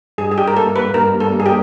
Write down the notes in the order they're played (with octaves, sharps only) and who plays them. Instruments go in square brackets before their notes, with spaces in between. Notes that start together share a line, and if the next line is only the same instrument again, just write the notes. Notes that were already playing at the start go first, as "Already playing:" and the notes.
[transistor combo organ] G2 [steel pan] G#4
[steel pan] G#4
G4
A#4
[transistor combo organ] A#3 [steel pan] A4
[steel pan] B4
[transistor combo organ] G2 [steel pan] A#4
[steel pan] A4
[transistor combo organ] A#3
[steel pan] G#4
G4